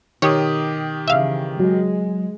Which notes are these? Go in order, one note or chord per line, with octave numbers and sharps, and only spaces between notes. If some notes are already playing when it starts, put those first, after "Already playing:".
B2 D#3 G4 C#5 D#6
C#3 E3 E5 F5
F#3 G#3